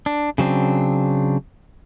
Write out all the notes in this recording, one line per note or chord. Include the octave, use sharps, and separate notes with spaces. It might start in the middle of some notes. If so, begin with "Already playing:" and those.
D4
C#3 F#3 C4 D4